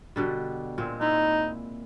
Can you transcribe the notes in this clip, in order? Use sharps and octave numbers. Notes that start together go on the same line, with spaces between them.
B2 D3 G3
A#2 G#3 C4
D#4 E4